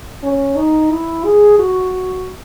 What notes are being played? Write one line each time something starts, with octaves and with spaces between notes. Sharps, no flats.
C#4
D#4
E4
G#4
F#4